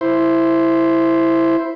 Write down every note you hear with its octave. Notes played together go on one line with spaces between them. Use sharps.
E4 C5